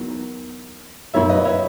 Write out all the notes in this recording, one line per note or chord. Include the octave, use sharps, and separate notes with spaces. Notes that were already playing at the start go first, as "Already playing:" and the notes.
Already playing: E2 D#3 F#3
F#2 D#3 F#3 C#5 E5
B4 D#5
C#5 E5